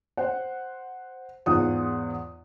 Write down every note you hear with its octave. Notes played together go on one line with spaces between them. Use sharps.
C5 F#5
E2 G#2 F4 F#5 D#6